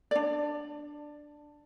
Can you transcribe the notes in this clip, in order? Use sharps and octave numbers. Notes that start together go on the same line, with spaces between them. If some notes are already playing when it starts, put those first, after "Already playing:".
D4 D5